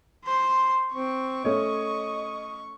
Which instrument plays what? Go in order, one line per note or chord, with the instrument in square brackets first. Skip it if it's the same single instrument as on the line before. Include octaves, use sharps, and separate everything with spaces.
[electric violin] C5 C6
[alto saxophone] C4 [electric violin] C#6
[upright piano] A3 C#4 C#5 [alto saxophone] D#5